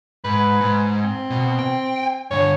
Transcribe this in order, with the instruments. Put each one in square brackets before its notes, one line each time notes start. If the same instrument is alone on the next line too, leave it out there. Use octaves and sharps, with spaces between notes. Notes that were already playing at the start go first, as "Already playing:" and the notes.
[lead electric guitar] G#2 [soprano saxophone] B4
[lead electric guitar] G#2
[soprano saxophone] C4
[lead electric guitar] B2
G5
[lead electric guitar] G2 D3 [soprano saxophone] C#5